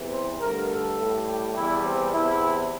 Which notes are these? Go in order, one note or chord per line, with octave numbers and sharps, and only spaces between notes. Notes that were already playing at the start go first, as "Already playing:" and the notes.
Already playing: E2 C3 E3
C5
G2 D3 A3 A#4
A4
A2 G3
G4
E2 E3 G3 E4
C4
E2 C3 E4